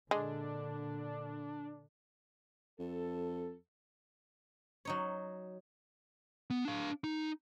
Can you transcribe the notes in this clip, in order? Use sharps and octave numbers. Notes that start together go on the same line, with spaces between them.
A#2 D3 G#3 D4
F2 A4
F#3 D#4 C#5
B3
D4 F5
D#4